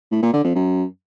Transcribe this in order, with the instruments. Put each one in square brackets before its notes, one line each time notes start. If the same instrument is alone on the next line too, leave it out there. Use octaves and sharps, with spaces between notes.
[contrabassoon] A2
A#2
D3
F2
F#2